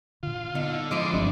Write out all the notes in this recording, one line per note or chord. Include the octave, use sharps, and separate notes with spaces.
A#2 D3 F4
D3 B3 D#4
F3 G#3 E4 D#5 C6 D6
F#1 G2 F#3 C4 D4